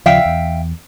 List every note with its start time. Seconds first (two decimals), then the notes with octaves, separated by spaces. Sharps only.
0.06 D#2 C#3 F3 E5 F5 G5
0.25 E2